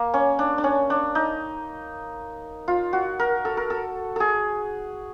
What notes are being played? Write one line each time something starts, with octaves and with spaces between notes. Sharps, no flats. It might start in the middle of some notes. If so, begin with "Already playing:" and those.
Already playing: A#3
C#4
D4
D4
C#4
D4
D#4
F4
F#4
A#4
A4
A#4
A4
G#4 A4